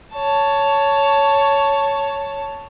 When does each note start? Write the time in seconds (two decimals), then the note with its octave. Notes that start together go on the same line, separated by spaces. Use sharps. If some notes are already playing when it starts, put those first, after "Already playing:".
0.13 C#5 A5